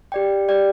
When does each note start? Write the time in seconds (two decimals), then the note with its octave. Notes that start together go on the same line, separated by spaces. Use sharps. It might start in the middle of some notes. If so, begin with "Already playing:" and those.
0.12 G4 D5 G5
0.48 G4 D5 G5